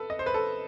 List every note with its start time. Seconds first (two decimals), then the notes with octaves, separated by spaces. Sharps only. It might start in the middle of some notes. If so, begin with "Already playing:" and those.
Already playing: A4 B4
0.10 D#5
0.19 C5
0.26 B4
0.34 A4